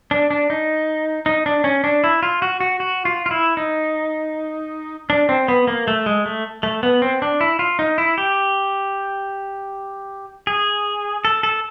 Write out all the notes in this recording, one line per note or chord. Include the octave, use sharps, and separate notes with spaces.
D4
D4
D#4
D#4
D4
C#4
D4
E4
F4
F#4
F#4
F#4
F4
F4
E4
D#4
D4
C4
B3
A#3
A3
G#3
A3
A3
B3
C4
D4
E4
F4
D#4
E4
G4
G#4
A4
A4